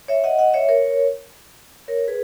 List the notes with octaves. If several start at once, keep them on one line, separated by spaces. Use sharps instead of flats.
C#5 E5
D#5 F#5
D#5 F#5
C#5 E5
A#4 C#5
A#4 C#5
G#4 B4